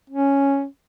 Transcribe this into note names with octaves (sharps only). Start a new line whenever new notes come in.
C#4